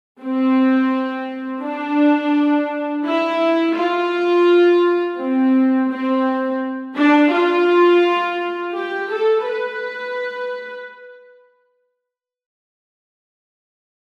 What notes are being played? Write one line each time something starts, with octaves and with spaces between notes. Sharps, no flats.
C4
D4
E4
F4
C4
C4
D4
F4
G4
A4
B4